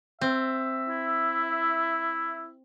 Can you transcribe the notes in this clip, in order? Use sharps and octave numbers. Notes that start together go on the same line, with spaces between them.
C4 E5
E4